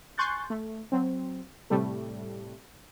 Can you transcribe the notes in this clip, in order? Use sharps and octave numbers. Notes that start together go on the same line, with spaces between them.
G#5 C6 C#6 F#6 G6 A6
A3
F#3 C4
A2 C3 G3 A3